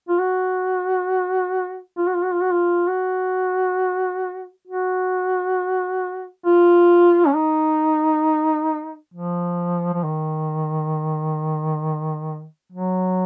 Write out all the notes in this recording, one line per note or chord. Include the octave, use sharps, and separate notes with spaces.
F4
F#4
F4
F#4
F4
F#4
F4
F#4
F4
F#4
F#4
F4
C#4
D#4
F3
F3
D#3
F#3